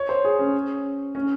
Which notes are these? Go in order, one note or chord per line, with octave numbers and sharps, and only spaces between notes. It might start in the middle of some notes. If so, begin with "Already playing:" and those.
Already playing: C#5
C5
G#4
C#4
C#4